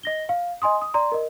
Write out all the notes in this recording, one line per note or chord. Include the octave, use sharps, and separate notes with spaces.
D#5 A#6 G7
F5
D#5 G#5 C6 D#6
D#6
D5 A#5 C6
A#4 D#5